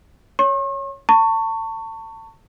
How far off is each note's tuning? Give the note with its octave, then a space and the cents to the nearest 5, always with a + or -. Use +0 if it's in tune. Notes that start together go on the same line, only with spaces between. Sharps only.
C#5 +0 C#6 -45
A5 +35 C#6 +0